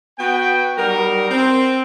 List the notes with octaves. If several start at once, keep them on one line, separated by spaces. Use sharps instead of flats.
B3 F#4 G5
F#3 G3 D#4 A#4
C4